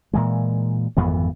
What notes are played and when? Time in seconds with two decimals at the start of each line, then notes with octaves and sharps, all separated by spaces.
0.13 A#2 E3 G#3
0.97 G#1 F2 E3 B3